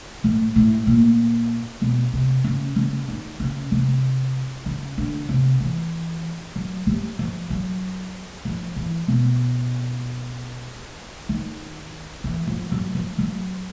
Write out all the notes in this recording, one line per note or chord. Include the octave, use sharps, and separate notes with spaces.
A2
A2
A#2
B2
C3
C#3
C#3
D#3
C#3
C3
C#3
D3
C3
E3
F#3
G3
F3
F#3
F3
E3
B2
D#3
E3
F3
F#3
F3
F#3